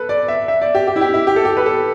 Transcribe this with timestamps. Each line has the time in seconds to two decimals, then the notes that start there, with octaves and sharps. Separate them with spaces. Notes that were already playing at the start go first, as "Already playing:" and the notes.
Already playing: A4 B4
0.09 D5
0.28 E5
0.48 E5
0.62 D5
0.75 G4
0.87 G4
0.96 E4
1.01 G4
1.14 E4
1.27 G4
1.36 A4
1.45 G4
1.57 B4
1.66 A4